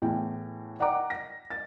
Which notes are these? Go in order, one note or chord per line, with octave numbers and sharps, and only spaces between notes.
E2 A2 G5
D5 F#5 G5 A#5 D6
A#6
A6